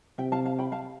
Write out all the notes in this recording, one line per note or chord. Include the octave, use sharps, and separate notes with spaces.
C3 E5 G5
F5 A5
F5 A5
G5 B5
F5 A5